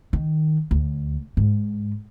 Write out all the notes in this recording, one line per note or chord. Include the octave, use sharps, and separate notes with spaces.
D#3
D2
G#2